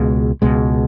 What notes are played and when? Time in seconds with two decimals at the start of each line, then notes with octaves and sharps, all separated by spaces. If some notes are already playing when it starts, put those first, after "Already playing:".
Already playing: C#2 B2 G#3
0.42 C#2 B2 G#3